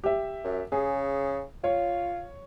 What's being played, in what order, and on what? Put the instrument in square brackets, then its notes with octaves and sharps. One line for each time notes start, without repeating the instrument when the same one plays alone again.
[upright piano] G4 E5
[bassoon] F#2
[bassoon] C#3 [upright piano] G#4
[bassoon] F4 [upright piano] C#5